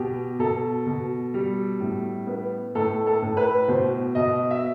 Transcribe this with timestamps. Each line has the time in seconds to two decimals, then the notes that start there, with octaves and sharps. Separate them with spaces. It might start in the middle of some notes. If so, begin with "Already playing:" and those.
Already playing: B2 G4
0.39 B2 A4
0.86 B2
1.34 G3
1.80 A2
2.27 B3
2.75 A2 A4
3.07 A4
3.22 A2
3.37 B4
3.68 B2 C5
4.15 B2 D#5
4.51 E5